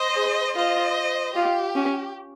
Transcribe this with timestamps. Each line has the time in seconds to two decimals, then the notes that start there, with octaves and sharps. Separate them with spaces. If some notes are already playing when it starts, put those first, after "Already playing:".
Already playing: C5 D#5
0.15 G#4
0.55 F4 C5 D#5
1.35 F4 G4
1.75 C#4